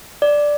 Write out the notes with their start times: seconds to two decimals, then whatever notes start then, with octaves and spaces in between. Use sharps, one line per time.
0.22 D5